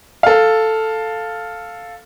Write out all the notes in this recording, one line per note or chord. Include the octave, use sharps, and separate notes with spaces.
A4 F5